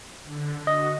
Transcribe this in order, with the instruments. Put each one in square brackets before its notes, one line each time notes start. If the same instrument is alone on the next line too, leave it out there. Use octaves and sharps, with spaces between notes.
[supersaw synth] D3
[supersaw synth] F#4 [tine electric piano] D#5